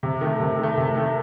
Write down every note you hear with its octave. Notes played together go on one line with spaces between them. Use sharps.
C3
D#3 A3
C3
D#3 A3
C3
D#3 A3